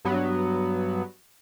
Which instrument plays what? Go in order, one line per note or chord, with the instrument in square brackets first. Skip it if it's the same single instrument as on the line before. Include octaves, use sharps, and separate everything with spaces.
[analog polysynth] G2 F#3 B3